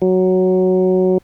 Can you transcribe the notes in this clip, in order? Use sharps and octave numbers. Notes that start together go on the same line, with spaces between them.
F#3